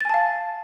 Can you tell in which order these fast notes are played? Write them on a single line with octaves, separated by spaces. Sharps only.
A6 G#5 A5 F5